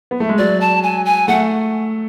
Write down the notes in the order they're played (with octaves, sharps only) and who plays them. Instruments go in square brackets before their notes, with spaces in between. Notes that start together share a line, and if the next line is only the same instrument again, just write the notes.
[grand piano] B3
A3
G#3
[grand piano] F#3 [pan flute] D5
[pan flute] A5
G#5
G#5
[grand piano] A3 [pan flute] F#5